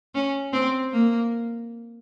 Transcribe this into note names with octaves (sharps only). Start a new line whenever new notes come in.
C#4
C4
A#3